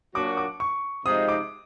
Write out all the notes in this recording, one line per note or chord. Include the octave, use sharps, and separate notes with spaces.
A#2 F#3 A#3 D4 F#4 D6
D6
C#6
C3 F3 G#3 C4 D#4 D#6
D6